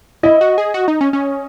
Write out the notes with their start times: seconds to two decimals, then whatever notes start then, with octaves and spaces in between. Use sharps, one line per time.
0.23 E4 D#5
0.41 F#4
0.58 G#4
0.74 F#4
0.88 D#4
1.01 C#4
1.13 C#4